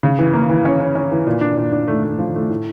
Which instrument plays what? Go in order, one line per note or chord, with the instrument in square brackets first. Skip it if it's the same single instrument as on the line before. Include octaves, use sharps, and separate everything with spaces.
[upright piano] C#3
E3
A#3
E3
C#4
C#4
C#4
E3
A#2
D4
A#2
D4
A3
A3
F3
A3
A2